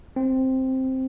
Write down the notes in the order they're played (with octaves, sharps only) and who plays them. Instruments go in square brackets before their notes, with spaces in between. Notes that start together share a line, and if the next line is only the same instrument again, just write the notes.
[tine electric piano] C4